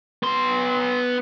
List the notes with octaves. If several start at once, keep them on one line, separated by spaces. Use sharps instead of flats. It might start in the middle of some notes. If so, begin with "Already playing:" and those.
B3 C6